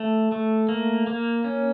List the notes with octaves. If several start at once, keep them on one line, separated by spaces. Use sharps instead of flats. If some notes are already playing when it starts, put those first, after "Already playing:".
Already playing: A3
A3
A#3
A#3
C#4